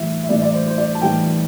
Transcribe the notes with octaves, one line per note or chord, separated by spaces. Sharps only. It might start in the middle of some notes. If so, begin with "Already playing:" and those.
Already playing: A2 E3 G3 E5
E5
A2 E3 G3 D5
D5
C5
C5
D5
A5
A2 E3 G3 G5